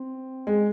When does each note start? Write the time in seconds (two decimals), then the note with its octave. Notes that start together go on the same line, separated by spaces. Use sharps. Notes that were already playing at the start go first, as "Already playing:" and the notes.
Already playing: C4
0.47 G#3